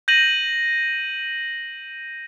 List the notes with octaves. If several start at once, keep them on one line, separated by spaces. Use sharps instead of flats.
G6 A#6 D#7 F#7